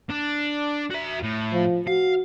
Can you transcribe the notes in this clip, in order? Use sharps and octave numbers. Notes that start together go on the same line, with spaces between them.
D4
F#4 E5
A2
F3
F#4 F5